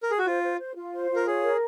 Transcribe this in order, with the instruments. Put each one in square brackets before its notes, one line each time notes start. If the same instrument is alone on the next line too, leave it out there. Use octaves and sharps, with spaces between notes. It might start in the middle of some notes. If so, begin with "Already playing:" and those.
[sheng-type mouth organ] A#4
G#4
F#4
[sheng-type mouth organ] F4 [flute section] C5
[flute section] C5
C5
F4
C5
F4
[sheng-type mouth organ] A#4
[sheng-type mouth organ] G#4 [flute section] C#5
[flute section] A#4